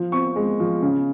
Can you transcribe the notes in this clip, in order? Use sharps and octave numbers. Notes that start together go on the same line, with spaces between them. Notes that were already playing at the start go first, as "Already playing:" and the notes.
Already playing: F3
C4 C#6
G#3
F3
C#3